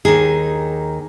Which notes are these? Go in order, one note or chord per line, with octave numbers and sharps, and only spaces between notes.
D#2 D#3 G#4